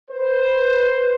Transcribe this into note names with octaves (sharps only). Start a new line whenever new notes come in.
B4 C5